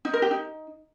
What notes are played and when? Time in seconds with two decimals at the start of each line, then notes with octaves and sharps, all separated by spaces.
0.05 D#4
0.13 A#4
0.22 G4
0.31 D#4